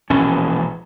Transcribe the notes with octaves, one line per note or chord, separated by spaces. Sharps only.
E1 A#1 E3 C#4